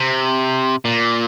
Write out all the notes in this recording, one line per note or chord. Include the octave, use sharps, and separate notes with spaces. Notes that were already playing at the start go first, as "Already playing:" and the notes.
Already playing: C3
A#2